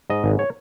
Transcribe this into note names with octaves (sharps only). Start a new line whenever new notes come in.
G#2 D#5
G#1
C#5